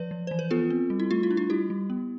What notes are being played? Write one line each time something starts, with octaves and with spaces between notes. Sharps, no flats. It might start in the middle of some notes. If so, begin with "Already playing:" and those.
Already playing: F3 B4 D5
F3
E3 C5
B4
B3 F4 A4
C4
G3
E4
A3 F4
E4
D4
F4
G3 E4 G4
G3
B3